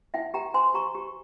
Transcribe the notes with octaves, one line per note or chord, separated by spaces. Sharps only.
E4 E5 G5
G4 G5 A#5
C5 G#5 C6
G4 A#5 C#6
G4